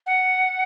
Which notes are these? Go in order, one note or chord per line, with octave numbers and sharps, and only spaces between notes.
F#5